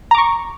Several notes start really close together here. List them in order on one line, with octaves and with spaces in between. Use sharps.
A#5 D6 C#6